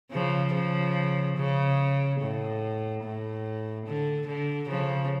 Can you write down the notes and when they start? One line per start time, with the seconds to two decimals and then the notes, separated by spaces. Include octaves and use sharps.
0.12 C#3 F3
0.54 C#3 F3
1.37 C#3
2.21 A2
3.04 A2
3.86 D3
4.27 D3
4.69 C#3 F3